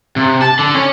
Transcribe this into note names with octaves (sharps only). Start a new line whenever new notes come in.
C3
A5
D3
C#4